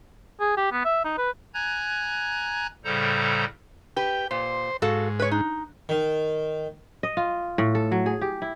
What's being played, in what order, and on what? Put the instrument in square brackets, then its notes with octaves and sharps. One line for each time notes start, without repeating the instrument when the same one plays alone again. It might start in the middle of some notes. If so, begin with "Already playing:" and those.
[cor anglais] G#4
G4
B3
E5
D#4
B4
[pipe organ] G#5 A#5 F#6 G#6
A2 C#3 G3 A4 C5 A#5
[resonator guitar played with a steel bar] G4 B4 [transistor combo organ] G5
[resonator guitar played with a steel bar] A#2 [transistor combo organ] C5
[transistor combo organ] G#2 [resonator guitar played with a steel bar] F#4 A4 F5
[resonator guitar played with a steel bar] B4 C#5
D#4
[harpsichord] D#3
[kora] D#5
F4
A2
A4
F#3
G#4
G4
E4